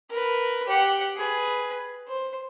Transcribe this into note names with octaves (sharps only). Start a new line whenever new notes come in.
A#4 B4
G4 F#5
G#4 B4
C5